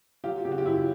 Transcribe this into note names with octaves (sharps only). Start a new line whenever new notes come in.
F#3 F4 G4
C#3 G4
F#4
F4 G4
F#2 E4